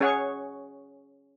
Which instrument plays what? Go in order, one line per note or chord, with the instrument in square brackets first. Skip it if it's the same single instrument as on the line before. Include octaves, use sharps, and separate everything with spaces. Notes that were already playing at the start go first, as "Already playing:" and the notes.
[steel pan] C#4 G#4 C#5 F#5 C#6